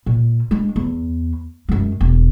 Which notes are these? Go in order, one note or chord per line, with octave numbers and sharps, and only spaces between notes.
A#2
G#3 D4
E2
F#2 G#3
E1